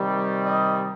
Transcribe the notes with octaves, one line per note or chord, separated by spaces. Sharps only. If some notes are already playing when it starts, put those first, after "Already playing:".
Already playing: C3 D#3 G3
D#5